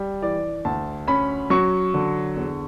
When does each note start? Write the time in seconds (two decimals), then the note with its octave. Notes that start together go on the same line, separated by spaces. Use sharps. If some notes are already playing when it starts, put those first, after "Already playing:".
Already playing: G3
0.22 E3 D5
0.65 D2 A5
1.07 C#4 B5
1.50 F#3 C#6
1.94 D3
2.36 E2